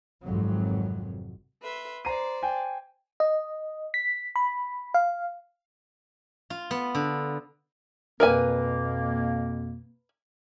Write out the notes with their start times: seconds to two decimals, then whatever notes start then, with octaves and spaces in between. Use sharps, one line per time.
0.23 G#1 F2 C3 F#3
1.62 B4 E5 C6
2.05 C5 D5 A#5 C7 D#7
2.43 G5 G#5
3.20 D#5
3.94 B6
4.36 B5
4.94 F5
6.50 F4
6.71 B3
6.95 D3
8.20 F2 B2 A#3 A#4 B4 G#5